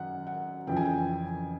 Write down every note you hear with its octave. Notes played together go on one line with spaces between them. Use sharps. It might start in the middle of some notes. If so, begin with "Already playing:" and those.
Already playing: F#2 D#3 F#5
F#5
F2 C#3 E3 G5
G#5
G5